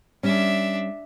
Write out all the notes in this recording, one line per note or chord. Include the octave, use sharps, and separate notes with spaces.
G3 C#4 D4 E5